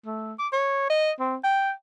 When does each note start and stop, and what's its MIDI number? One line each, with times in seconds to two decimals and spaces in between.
0.06 0.34 57
0.39 0.48 86
0.53 0.87 73
0.90 1.12 75
1.19 1.36 60
1.44 1.72 79